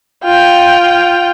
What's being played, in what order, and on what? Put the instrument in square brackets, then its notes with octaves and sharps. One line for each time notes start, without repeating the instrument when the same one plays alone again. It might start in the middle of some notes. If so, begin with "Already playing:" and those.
[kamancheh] F4 G5